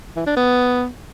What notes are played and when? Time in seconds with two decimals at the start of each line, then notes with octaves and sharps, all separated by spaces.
0.16 E3
0.26 D4
0.36 B3